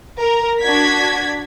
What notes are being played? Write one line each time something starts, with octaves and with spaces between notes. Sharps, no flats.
A#4
D4 F#4 G#6 B6